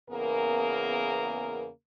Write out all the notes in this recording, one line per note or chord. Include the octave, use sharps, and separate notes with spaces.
E2 C#3 A#3 B3 G#4 A#4